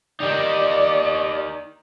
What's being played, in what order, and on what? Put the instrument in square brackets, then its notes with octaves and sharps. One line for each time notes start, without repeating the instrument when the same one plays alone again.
[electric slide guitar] D#4 G4 A#4 [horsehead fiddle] D5